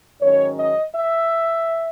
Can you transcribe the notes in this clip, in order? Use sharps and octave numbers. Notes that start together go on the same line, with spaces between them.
G#2 D#3 F#3 C#4 C#5
D#5
E5